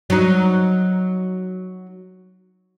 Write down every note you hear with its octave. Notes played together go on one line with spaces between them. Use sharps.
F#3 D#4